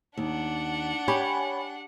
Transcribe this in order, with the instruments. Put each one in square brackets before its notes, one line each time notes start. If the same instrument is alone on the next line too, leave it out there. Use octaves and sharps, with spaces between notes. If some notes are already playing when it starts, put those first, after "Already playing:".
[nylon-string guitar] D#2 [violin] D4 F#5
[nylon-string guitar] G4 [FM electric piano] C#5 G#5 B5